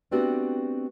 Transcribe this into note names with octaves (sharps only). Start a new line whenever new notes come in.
A3 B3 C4 D4 F#4 G4